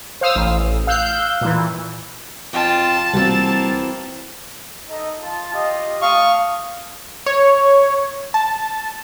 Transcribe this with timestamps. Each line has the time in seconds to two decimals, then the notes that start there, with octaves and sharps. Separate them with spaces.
0.21 C5 F5 D#6 E6
0.35 A1
0.87 F5 E6 F#6 G6
1.41 A#2 E3
2.53 F2 F4 G5 A5
3.13 C2 E3 G3 A#3 C4 F#4
4.89 D#4 A4 D#5
5.21 F4 A5
5.54 F4 G4 D#5
6.02 A3 F5 A5 C#6 D#6
7.26 C#5
8.34 A5